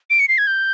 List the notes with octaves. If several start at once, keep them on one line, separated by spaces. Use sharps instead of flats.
D7
C#7
C7
G#6
G6